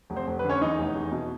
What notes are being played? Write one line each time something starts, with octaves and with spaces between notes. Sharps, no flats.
F1
C4 C5
F1
B4
D3
C#4 C#5
E2 D#4 D#5
F1
E2
B2